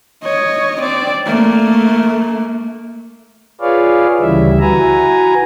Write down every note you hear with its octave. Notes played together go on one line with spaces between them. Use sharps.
C#5 D#5
C4 D5
A3 A#3
F4 G#4 B4 C#5 D5 F5
D2 C#3 E3 G3 E4 E5
E4 F#4 B4 G#5 A#5